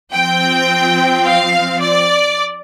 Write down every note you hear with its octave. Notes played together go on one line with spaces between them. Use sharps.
F3 C4 G5
F5
D5